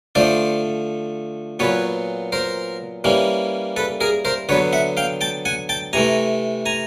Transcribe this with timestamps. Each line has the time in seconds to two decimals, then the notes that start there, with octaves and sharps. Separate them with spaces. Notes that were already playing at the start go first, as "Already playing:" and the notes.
0.15 D3 F3 A3 C5 D5
1.59 A#2 F#3 B3 B4 C#5
2.32 A#4 C5
3.04 E3 G3 A#3 C#4
3.76 A4 B4
4.01 G#4 A#4
4.25 A#4 C5
4.49 D3 F#3 B3 B4 C#5
4.73 E5 F#5
4.97 F5 G5
5.21 G5 A5
5.45 F#5 G#5
5.69 G5 A5
5.93 C3 E3 A3 G#5 A#5
6.66 G#5 A#5